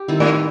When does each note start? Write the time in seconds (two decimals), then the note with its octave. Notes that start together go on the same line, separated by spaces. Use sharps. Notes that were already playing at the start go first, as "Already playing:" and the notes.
Already playing: G4
0.08 D#3 G3 C4 E4
0.20 A2